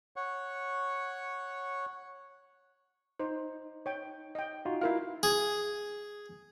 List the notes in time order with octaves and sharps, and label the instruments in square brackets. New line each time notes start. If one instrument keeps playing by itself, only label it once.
[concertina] C#5 F#5 C#6
[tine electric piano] D#4 [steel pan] C5
[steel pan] C#5 G5
D#5 G5
[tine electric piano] D#4 F4 F#4
[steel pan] E4 A#4 F5
[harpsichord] G#4